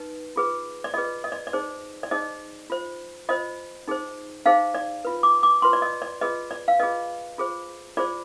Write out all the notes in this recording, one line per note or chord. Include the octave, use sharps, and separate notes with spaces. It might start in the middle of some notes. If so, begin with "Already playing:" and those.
Already playing: D#4 B4
F4 G#4 B4
D5
F4 G#4 B4 D#5
D#5
D5
D5
D#4 G#4 C5
D5
D#4 G#4 C5 D#5
F4 C5
F4 C5 D#5
D#4 G#4 C5
D#4 G#4 C5 F5
D5
F4 B4
D6
D6
F4 B4 C6
D5
D#5
D5
F4 G#4 B4 D#5
D5
F5
F4 G#4 B4 D#5
F4 G#4 C5
F4 G#4 C5 D5